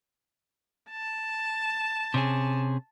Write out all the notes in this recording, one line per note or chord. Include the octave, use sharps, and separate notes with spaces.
A5
C3 C#4 G#4